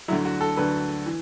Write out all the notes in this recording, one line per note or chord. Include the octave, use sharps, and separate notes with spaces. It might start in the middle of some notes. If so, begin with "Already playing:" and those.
D2 D3 F#3 E4
F#4
A4
D2 D3 F#3 B4
E3